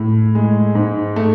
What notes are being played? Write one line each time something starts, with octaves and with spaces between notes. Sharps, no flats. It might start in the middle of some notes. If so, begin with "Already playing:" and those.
Already playing: A2
G#3
G#2
A3